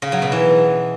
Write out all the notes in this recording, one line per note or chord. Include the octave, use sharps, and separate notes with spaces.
C#3
F#3
B2
E3